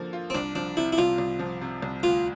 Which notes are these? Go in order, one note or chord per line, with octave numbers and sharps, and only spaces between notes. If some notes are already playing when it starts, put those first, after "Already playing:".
Already playing: D3 F3 A#3
F4
C4
C2 D4
F3 D4
C3 E4
E4
C2 F4
C2
F3
C3
C2
D2 F4